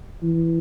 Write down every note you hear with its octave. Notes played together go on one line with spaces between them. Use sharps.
E3